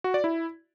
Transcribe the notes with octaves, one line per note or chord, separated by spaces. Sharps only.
F#4
D5
E4